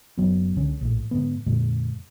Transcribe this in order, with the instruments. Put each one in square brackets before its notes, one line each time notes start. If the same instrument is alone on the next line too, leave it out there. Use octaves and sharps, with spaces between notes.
[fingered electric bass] F#1 F#3 B3
C#2 D3 C#4
A#1 A2
G#2 D3 B3
F2 A#2 D3 G#3